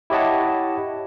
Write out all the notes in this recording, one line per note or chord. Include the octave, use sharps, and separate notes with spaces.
E4 G4 C#5 D#5 F#5 A5